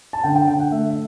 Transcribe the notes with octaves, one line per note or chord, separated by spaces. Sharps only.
A5
D3 G5
G5
D3 G5
F#5
A3 E5
E5